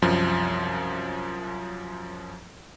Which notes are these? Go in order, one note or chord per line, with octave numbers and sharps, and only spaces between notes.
C2 F#2 F3